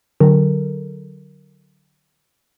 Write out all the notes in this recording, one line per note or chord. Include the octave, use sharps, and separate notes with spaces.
D3 F#3 A4 A#4